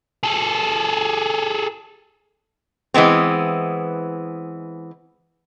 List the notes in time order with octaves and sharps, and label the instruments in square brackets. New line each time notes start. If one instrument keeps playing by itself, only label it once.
[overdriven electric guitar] G#4 A4
[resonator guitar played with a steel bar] E3 G#3 B3 C4